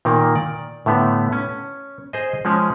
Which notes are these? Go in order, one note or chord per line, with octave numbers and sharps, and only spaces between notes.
A#2 D#3 A#3
D5
A2 D3 A3 B3
C#4
G#4 C5 D#5
F3 G#3 C#4